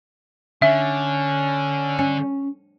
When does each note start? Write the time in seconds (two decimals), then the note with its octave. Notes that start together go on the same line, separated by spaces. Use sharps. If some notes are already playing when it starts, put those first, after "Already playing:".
0.62 D3 C#4 E5
1.99 C#4